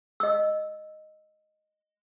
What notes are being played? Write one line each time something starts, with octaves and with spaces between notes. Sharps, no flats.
D#5 E6